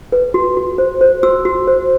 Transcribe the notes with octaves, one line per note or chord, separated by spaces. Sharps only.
B4
F#4
F#4
C5
C5
F#4 E6
F#4
C5